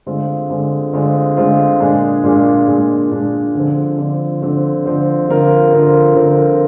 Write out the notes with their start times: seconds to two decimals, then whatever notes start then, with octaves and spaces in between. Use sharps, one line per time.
0.06 D3 G#3 C4 F4
0.49 D3 G#3 C4 F4
0.93 D3 G#3 C4 F4
1.37 D3 G#3 C4 F4
1.80 A#2 G#3 D4 G#4
2.23 A#2 G#3 D4 G#4
2.67 A#2 G#3 D4 G#4
3.11 A#2 G#3 D4 G#4
3.55 D3 F3 C4
3.98 D3 F3 C4
4.42 D3 F3 C4
4.85 D3 F3 C4
5.28 D3 F3 C4 F4 A#4
5.72 D3 F3 C4 F4 A#4
6.15 D3 F3 C4 F4 A#4